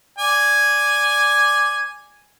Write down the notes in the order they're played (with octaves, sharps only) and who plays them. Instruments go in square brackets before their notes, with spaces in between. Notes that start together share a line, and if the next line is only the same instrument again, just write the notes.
[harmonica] D5 G#5